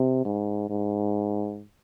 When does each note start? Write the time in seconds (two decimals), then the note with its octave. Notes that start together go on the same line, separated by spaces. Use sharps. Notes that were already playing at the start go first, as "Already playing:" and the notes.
Already playing: C3
0.25 G#2
0.70 G#2